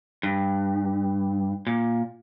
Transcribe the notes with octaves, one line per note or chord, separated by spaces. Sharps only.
G2
A#2